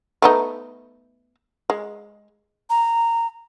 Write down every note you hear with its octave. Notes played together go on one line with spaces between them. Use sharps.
A3 B3 D#4
G#3
A#5